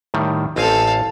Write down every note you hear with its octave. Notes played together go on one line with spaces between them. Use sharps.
A2 D#3 G3
A1 C4 A4 F5 G#5